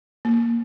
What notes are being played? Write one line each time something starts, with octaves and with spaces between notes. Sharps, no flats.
A#3